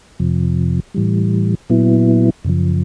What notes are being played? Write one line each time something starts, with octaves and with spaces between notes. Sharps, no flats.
F2 C3 F3
A2 E3 G3
A#2 F#3 B3 E4
F#2 C#3 F3